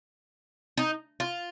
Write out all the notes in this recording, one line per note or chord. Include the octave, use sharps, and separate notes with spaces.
D#4
F4